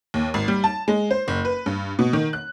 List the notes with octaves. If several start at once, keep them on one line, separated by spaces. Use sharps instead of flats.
D#2
G#1
G3
A5
G#3
C5
F#1
B4
G2
B2
D#3
F#6